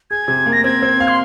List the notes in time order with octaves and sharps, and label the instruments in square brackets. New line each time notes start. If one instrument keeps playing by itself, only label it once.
[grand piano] G#4 [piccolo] G#6
[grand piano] C3
A#3
[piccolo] A#6
[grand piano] C4 [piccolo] G#6
[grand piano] C4
F5
[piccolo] C6